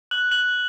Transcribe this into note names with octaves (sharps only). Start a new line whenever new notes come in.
F#6 F#7
F#6 F#7